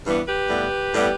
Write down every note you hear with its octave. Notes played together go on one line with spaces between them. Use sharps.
G2 E3 G3 B3
G4 B4
A2 G3 B3
A2 G3 B3